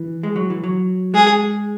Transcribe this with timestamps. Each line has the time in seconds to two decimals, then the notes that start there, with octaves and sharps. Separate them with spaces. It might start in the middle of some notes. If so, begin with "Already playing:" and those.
Already playing: E3
0.23 G#3
0.36 F#3
0.50 E3
0.64 F#3
1.14 G#3 G#4